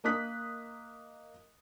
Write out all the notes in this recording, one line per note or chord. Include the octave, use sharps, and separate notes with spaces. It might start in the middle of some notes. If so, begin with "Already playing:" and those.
A#3 A#4 D#5 D#6 F#6 B6